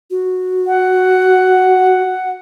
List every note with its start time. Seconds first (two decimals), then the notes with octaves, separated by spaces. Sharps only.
0.10 F#4
0.67 F#5